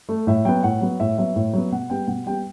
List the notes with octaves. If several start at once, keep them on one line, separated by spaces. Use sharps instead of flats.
A3
A2 E5
F#3 B3 G5
A2 F#5
F#3 B3
A2 E5
F#3 B3 E5
A2
F#3 B3
B2 F#5
G3 B3 G5
B2 F#5
G3 B3 G5